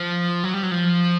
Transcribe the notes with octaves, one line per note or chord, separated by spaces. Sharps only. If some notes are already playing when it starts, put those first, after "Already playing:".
Already playing: F3
F#3
G3
F#3
F3